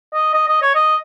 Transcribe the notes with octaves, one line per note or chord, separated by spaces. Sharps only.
D#5
D#5
D#5
C#5
D#5